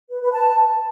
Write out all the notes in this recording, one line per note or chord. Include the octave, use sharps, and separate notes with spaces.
B4
B4
A5